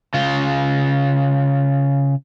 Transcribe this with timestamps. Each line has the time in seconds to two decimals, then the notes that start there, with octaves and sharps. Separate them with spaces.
0.14 C#3 F4